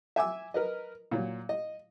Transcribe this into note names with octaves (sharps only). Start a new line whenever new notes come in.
E5 G#5 D6 E6
A#4 B4 D#5
A#2 F#3
D#5